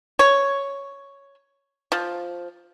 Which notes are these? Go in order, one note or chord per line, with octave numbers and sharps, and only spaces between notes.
C#5
F3